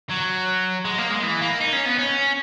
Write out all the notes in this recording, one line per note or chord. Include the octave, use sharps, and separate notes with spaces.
F#3
G#3
A#3
G#3
E3
A#3
D#4
C#4
B3
C#4